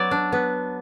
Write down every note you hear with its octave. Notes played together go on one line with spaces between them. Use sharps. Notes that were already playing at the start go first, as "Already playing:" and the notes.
Already playing: F#3 B3 D5
D4
B3